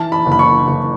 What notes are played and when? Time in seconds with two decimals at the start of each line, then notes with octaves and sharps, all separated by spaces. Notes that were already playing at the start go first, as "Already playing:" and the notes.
Already playing: E3 A5
0.12 B5
0.26 F#1
0.32 B5
0.39 C#6
0.67 F#1